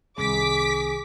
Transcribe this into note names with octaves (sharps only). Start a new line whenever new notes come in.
C2 D#3 G#4 D6 B6